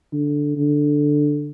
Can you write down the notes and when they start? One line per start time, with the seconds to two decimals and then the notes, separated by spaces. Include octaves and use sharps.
0.13 D3
0.57 D3